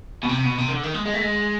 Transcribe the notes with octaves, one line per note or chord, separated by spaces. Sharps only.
B2
C3
B2
C3
D#3
D3
D#3
G#3
G#3
A3
G#3